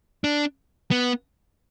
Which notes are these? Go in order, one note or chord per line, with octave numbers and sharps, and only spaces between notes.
D4
B3